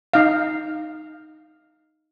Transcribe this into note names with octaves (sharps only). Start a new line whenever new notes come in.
D#4 F5